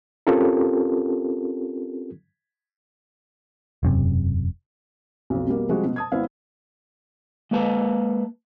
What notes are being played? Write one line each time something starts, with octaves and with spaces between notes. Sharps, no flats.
C4 C#4 F4 G4 A4 A#4
E1 F#2 C3
B1 F2
B2 G3 A#3
C3 F3 G3 G#3 F#4
B2
A5 D#6 G#6
G#1 B3 E4 F5
G#3 A#3 B4 A5